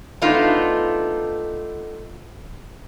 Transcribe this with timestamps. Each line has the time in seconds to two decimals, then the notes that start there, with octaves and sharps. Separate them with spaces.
0.22 A3 B3 D4 D#4 F4